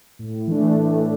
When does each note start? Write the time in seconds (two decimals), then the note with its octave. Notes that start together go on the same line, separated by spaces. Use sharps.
0.19 A2
0.47 E3 A3 D4
0.77 A2